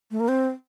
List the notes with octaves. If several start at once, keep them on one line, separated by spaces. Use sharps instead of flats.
A3
A#3
C4